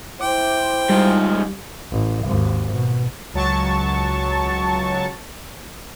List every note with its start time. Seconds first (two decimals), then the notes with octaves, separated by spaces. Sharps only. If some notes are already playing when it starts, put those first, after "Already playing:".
0.21 E4 C5 G5 D6
0.89 G#2 F3 G3
1.91 A1
2.24 G#1 D#2
2.72 B2
3.34 C#2 F#3 A5 C#6 A6